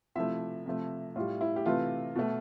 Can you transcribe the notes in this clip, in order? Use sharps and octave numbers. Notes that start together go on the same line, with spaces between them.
C3 F3 A3 E4 E5
C3 F3 A3
A2 G3 F4
E4
G4
C3 E3 A3 F4
B2 A3